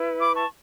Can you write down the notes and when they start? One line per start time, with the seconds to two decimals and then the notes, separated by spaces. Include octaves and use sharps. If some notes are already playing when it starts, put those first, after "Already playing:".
Already playing: E4 B4
0.21 B5 D6
0.35 A5 C#6